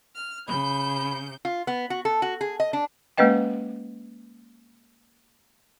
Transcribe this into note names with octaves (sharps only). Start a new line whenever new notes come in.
F6
C#3 B5 G6
F4
B3
F#4
A4
F#4
G#4
D#5
D4
G#3 A#3 C#4 B4 D#5 G5